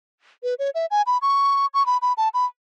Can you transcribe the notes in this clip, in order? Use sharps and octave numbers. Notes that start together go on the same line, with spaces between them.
B4
C#5
E5
G#5
B5
C#6
C#6
B5
B5
A5
B5